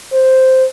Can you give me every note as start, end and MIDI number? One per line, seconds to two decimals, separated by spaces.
0.13 0.65 72